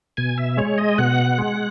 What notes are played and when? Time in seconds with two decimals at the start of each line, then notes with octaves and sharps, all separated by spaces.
0.17 B2 G#5
0.38 E5
0.57 G#3 C#5
0.78 D#5
0.98 B2 F#5
1.38 G#3